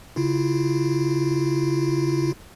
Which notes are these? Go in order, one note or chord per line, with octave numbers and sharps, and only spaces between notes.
C#3 E4 F4